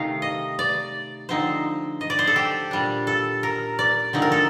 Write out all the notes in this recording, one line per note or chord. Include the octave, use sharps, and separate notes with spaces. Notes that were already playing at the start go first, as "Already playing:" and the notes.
Already playing: C3 D#3 A3 D#4 F5
D#5
D5
D3 F3 C4 D#4 C5
D#5
D5
C5
A4
G4
A#2 G3 D4
A4
A#4
D5
D3 F3 A3 C4 D#4
A#4
A4